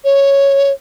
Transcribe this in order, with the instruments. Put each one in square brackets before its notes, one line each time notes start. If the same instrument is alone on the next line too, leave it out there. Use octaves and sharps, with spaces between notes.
[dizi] C#5